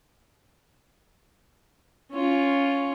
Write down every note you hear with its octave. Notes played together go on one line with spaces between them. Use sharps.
C#4 F4